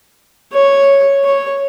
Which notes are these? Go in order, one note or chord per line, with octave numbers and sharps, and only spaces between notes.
C#5
C#5